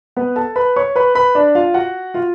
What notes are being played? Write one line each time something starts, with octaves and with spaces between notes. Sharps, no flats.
B3 B4
A4 A5
B4 B5
C#5 C#6
B4 B5
B4 B5
D4 D5
F4 F5
F#4 F#5
F4 F5